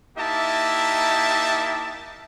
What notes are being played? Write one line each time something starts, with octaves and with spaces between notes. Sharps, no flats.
A#3 D#4 E4 G4 E5 A5